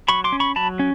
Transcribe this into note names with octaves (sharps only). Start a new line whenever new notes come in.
F#3 B5 C#6
C6 D6
C#4
B5 C#6
F#3 A5 B5
C#4